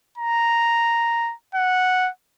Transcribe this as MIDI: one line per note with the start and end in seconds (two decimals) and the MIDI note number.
0.18 1.34 82
1.55 2.10 78